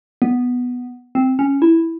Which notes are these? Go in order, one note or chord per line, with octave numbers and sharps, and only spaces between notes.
B3
C4
C#4
E4